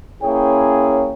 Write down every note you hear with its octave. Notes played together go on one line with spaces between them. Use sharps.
A#3 C#4 E4 G#4 C#5 G5